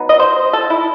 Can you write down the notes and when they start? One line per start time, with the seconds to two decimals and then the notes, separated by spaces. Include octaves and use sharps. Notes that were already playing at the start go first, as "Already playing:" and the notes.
Already playing: F#3 B3 D#4
0.09 D#5
0.19 C5
0.53 A4
0.70 E4